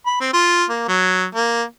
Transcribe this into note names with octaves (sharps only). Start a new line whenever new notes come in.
B5
C4
F4
A#3
F#3
A#3